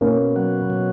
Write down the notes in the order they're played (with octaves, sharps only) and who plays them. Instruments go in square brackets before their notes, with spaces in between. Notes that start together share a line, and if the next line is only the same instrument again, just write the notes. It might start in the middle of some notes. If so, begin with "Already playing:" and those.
[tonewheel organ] B2 [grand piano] A#3 C#4
[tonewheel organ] F#3
B2